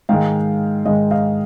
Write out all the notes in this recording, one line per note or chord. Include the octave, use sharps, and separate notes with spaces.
G#2 D#3 G#3 F5 G5
G#2 D#3 G#3 D#5 F5
D#5 F5